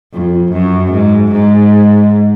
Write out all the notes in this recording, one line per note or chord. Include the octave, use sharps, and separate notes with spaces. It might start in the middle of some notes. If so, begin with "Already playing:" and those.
F2
F#2
G#2
G#2